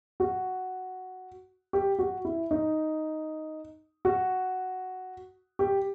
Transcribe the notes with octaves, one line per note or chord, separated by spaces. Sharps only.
F#4
G4
F#4
E4
D#4
F#4
G4